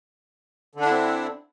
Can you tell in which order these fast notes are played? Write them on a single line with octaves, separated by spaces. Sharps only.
D3 D4 E4 C4